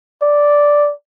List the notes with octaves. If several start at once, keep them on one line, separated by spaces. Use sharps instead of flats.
D5